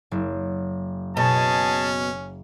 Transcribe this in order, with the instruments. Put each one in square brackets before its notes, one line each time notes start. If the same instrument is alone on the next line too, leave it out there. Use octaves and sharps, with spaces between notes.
[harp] F#1
[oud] B2 [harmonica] C#4 [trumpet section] G#4 A5